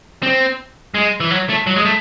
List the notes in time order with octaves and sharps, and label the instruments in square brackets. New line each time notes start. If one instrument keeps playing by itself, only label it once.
[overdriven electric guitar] C4
G#3
E3
F#3
A3
F#3
G#3
A3